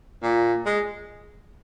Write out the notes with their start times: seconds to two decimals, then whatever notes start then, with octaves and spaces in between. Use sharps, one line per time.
0.22 A#2
0.66 G#3